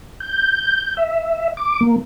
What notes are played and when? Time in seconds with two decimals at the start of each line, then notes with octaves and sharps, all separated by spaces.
0.20 G6
0.97 E5
1.57 D6
1.81 A#3